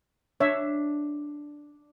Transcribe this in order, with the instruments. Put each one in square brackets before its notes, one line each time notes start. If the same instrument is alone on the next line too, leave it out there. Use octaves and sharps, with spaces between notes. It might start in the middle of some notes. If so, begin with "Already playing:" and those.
[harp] D4 [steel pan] C#5 E5